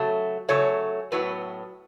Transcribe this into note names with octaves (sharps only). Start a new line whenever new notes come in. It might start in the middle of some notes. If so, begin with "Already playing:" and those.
Already playing: C#3 F#3 A3
C#3 F#3 A3 C#5
A2 F#3 B3 B4